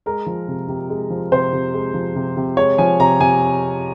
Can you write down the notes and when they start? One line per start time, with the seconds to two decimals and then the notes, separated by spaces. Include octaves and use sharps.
0.06 G#3 A#4
0.26 F3
0.48 C3
0.69 C3
0.90 G#3
1.10 F3
1.32 C3 C5
1.53 C3
1.73 G#3
1.94 F3
2.16 C3
2.37 C3
2.57 G#3 C#5
2.78 F3 G#5
3.00 C3 A#5
3.20 C3 G#5